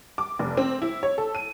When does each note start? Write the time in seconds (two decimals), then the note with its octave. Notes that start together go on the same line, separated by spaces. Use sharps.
0.18 D6
0.39 F1
0.57 C4
0.82 E4
1.03 C#5
1.18 A4
1.35 D#7